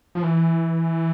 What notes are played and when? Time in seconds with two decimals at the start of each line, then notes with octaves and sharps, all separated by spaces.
0.15 F3
0.22 E3